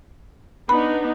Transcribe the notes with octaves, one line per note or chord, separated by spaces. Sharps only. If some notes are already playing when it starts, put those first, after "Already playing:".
B3 D4 D#4 B5